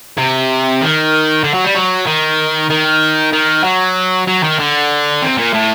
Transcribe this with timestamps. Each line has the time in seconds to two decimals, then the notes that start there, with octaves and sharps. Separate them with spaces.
0.18 C3
0.81 D#3
1.44 D3
1.54 F#3
1.65 G3
1.75 F#3
2.07 D#3
2.70 D#3
3.33 D#3
3.64 F#3
4.27 F#3
4.43 D#3
4.59 D3
5.22 C3
5.38 A#2
5.53 A2